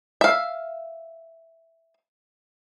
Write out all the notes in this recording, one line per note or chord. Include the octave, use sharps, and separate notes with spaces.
E5 F5